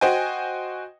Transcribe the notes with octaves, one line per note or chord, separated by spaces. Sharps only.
F#4 C5 D#5 G5 G#5